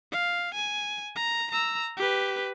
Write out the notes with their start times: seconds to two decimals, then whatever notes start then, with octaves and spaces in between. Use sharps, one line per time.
0.12 F5
0.54 G#5
1.16 A#5
1.51 A#5 E6
1.97 G4 B4